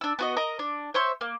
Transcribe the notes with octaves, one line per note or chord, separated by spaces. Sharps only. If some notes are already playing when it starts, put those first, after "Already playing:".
D4 E6
B3 F#4 D#5
A#4 D#5 A#5
D4
C5 C#5 E5 C6
A#3